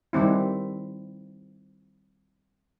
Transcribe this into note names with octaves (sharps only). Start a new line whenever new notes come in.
D#3 G3 C4 E4